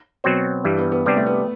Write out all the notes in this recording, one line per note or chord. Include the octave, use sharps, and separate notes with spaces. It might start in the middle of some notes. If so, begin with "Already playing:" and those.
B2 F#3 C4 F#4 C5
G2 E3 G3
B3
B3
C3 G3 B3 D4 G4
A3
B3